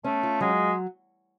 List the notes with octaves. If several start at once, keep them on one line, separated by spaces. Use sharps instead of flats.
A3 C#4
F4
F#3 G#3